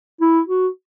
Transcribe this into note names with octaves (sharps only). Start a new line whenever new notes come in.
E4
F#4